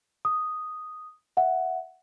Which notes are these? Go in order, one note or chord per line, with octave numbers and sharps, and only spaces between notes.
D#6
E5 F#5